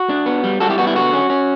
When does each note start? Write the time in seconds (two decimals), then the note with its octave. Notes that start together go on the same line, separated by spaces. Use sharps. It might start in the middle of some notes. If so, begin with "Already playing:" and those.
Already playing: F#4
0.09 D4
0.26 B3
0.44 G3
0.60 G3 F#4 A4
0.69 E4 G4
0.78 B3 F#4
0.87 E4
0.95 D3 F#4
1.14 C#4
1.30 C#4